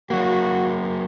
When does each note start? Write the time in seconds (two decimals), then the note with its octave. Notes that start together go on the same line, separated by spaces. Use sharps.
0.10 F#3 A#3 F#4